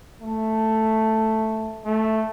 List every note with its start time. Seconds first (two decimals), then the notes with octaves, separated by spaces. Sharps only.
0.22 A3
1.85 A3